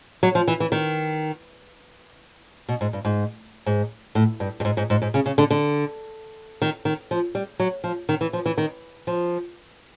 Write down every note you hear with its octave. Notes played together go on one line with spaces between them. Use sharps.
F#3
F3
E3
E3
D#3
B2
G#2
G2
G#2
G#2
A2
G2
G2
G#2
G#2
G#2
G#2
C#3
C#3
D3
D3
D#3
D#3
F3
G3
F#3
F3
D#3
E3
F3
E3
D#3
F3